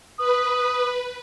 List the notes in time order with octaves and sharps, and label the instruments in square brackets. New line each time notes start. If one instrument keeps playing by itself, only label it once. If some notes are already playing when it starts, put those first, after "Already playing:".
[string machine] B4 [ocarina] D#6